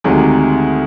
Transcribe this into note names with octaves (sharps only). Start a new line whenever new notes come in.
D2 C3 D#3 G#3